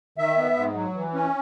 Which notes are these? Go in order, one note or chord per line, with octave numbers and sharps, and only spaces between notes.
D#3 E5
B3
G#2
F#3
E3
C#4